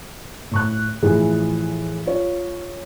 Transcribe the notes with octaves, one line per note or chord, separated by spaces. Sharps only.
A2 C#6 F#6
A2 E3 F3 G#4
F4 C#5